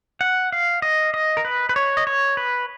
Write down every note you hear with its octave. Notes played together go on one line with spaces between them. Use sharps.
F#5
F5
D#5
D#5
A#4
B4
B4
C#5
D#5
C#5
B4